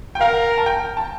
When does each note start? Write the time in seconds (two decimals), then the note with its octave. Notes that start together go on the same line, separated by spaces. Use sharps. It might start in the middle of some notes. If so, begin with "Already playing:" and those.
0.15 G5
0.21 A#4 F5
0.58 A5
0.66 G5
0.97 A5